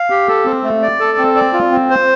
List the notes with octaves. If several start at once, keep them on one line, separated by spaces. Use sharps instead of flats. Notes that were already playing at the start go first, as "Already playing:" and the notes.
Already playing: F5
G4
A4
C4
A3
D5
A4
C4
D5
F4
C4
C5